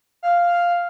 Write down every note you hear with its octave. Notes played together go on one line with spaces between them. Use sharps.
F5